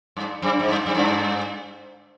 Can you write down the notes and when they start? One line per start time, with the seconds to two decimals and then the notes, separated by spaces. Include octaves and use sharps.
0.17 G2
0.42 F#2
0.59 G#2
0.68 G2
0.86 F#2
0.95 G2